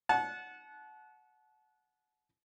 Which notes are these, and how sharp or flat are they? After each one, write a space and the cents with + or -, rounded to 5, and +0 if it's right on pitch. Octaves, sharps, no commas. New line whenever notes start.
F#5 -10 A5 -35